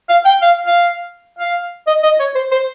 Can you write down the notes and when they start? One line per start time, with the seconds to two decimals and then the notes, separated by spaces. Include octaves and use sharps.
0.09 F5
0.25 G5
0.42 F5
0.66 F5
1.38 F5
1.87 D#5
2.03 D#5
2.19 C#5
2.35 C5
2.51 C5